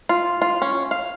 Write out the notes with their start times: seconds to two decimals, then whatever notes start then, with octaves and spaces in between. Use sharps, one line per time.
0.09 F4
0.42 F4
0.62 C#4
0.91 F5